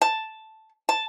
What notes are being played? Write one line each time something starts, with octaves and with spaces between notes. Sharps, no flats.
A5
A5